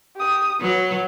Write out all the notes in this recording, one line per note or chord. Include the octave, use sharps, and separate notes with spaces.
G4 D#6
F#3 B4